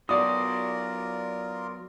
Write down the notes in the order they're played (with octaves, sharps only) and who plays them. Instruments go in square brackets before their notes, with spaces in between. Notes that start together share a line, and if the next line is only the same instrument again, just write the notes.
[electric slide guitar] F#3 B3 F#4 [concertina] F4 A#4 [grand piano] D5 D#6